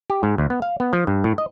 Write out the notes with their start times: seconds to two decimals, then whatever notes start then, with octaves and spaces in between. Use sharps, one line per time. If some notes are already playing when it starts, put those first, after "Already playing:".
0.10 G4
0.23 G#2
0.38 D2
0.50 B3
0.62 F5
0.80 B3
0.93 F3
1.07 G2
1.24 A2
1.38 D#5